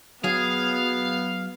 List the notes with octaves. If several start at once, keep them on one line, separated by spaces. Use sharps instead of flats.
F#3 B3 G#4 F5